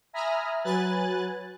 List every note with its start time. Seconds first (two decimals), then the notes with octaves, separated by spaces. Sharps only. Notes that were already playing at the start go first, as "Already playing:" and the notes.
0.13 E5 G#5 A#5 B5 D#6 F6
0.64 F#3 B4 G#5 F#6 A6